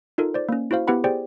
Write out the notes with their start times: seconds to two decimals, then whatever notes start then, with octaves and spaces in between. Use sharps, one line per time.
0.18 D#4 F4 A4 A#4
0.34 C5 D5
0.49 A#3 C#4
0.71 E4 F#4 C5 F5
0.87 B3 E4 G4 B4 F#5 B5
1.04 G4 G#4 C5 D5 G5